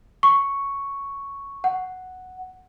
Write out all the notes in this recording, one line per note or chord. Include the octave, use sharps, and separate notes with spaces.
C#6
F#5